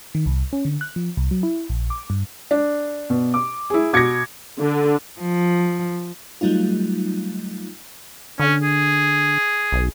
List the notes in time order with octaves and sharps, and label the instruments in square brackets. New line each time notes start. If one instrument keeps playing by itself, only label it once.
[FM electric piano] D#3
C2
C#4
D3
F#6
F3
C2
F#3
E4
A#1
D6
G2
[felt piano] D4
[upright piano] B2
D6
[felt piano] E4 G#4
[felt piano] B2 A#6 [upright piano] D6 G#6 C#7
[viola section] D3
[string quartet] F3
[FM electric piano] F#3 G3 A3 D#4 F4
[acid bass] D3 [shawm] C#4
[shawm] G#4
[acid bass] B1